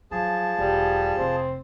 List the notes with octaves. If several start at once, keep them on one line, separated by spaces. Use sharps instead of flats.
F3 F#3 G#4 A5
E1 G3
F1 C4